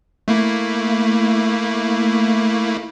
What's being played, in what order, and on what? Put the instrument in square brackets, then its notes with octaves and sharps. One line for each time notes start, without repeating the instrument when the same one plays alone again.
[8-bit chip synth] A3 A#3 E4